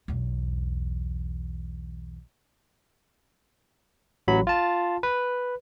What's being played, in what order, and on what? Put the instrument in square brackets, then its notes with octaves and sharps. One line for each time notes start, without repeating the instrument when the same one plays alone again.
[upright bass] B1 E2
[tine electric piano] A1 F#3 B5
F4 A5
B4